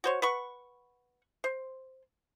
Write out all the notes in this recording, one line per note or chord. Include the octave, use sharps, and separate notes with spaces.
F#4 C5 C#5
B4 F#5 C#6
C5